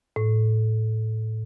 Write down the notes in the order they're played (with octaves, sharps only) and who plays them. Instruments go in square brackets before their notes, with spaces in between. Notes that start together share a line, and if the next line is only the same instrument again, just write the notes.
[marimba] A2